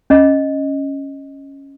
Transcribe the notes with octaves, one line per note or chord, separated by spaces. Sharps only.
C#4 D#5